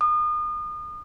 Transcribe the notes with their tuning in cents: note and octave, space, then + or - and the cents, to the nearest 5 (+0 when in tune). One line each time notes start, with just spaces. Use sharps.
D#6 -35